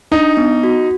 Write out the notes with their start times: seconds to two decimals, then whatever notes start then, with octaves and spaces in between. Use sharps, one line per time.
0.12 D4 D#4
0.37 B3
0.64 F#4